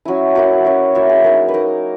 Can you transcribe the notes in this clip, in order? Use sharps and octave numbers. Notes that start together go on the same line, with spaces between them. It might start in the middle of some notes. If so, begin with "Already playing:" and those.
F#3 C#4 E4 G#5
F#3 A#3 E4 F#5
F#3 C#4 E4
F#3 A#3 E4 E5
G#4
A#3 D#4 A#4
B4
A#3 D#4 A#4